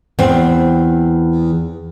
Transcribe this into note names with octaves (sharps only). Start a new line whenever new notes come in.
E2 C4